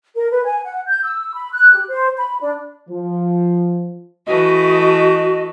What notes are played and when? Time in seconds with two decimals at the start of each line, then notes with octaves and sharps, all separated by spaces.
0.15 A#4
0.31 B4
0.45 G#5
0.65 F#5
0.88 G6
1.04 E6
1.35 B5
1.53 F#6
1.74 G4
1.88 C5
2.18 B5
2.40 D4
2.89 F3
4.27 E3 A3 F#4 B4 D#5